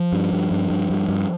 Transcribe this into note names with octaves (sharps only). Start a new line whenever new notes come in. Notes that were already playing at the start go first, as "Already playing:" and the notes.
Already playing: F3
G2
G2
G2
G2
G2
G2